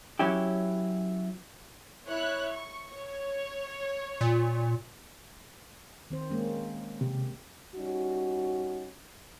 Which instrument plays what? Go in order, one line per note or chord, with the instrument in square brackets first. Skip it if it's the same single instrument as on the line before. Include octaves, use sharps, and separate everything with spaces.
[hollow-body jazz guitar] F#3 C#4 E4 G4
[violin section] E4 C#5 F#6
C#6
C#5
[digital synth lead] A#2
[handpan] D#3 C4 C5
G#3 A#3 C#4
[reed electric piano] C3 [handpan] G4
[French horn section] G3 C#4 D#4 F#4